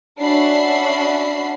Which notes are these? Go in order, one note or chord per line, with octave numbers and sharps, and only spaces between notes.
C#4 D4 F#4 E5 B5 C7